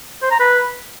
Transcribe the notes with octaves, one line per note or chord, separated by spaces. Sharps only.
C5
A#5
B4